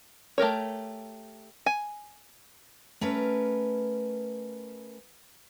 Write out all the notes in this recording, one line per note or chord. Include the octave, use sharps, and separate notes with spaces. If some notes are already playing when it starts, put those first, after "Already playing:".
A3 G4 A#4 C#5
G#5
A3 C#4 A#4 B4